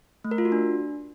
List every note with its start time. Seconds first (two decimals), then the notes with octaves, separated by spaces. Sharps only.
0.24 A3
0.31 A#4
0.38 F4
0.45 F#4
0.52 D4